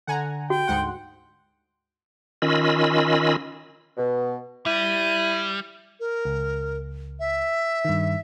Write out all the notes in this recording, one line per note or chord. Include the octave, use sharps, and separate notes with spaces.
D3 F#5 G#5 A#5
F#4 G5
D2 G#2 F#5 C6
D#3 C#4 F4 D#5 B5 E6
B2
G3 E4 D#7
A#4
C#2
E5
G2 D#3